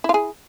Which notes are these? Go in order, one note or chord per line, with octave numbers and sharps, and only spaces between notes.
E4 F4 G#4